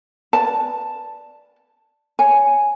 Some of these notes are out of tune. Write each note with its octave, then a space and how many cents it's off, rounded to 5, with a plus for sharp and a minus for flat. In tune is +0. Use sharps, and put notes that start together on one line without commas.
B4 +0 D5 +0 A5 +0
C#5 +10 G#5 +0